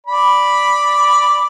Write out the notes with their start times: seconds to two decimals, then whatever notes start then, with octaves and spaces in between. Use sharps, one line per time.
0.06 D5 B5